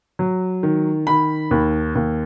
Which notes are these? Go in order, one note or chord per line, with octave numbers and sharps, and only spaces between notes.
F#3
D#3
D#3 B5
D#2
D#2